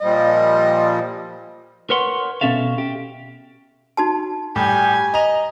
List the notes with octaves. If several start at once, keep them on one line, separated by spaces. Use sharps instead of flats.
A#2 F3 G3 D#5
A#4 B4 C#5 F#5 C6
B2 A#3 C#4 A4 E5 F5
G4
D#4 F#4 A5
A2 G3 G4 G#5
D#5 A#5 F7